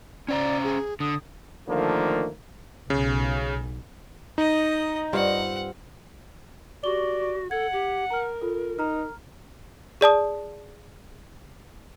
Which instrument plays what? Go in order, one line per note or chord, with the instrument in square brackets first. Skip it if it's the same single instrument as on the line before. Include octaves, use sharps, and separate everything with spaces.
[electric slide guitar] C#4 C5 A#5 [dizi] D5
[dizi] G#4
[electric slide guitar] D3 [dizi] D#6
[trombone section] D3 D#3 F3 A3 A#3
[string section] B1 [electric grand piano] C#3
[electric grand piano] D#4 [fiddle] D#5
[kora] G2 C4 F4 [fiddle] F#5
[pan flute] F#4 [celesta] G4 C#6 G7 [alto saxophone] D5
[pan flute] A4 [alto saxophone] F#5 [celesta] G#6
[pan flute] G4
[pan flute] A#4 [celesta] A#5 F6
[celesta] F4 A4
[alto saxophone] D#4 [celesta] A#5 F6
[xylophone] G#4 D5 A5 D#6